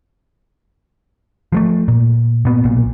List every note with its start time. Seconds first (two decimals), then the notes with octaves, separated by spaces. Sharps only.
1.52 F3 G#3 A3
1.88 A#2
2.45 A#2 B3
2.64 B1 A#2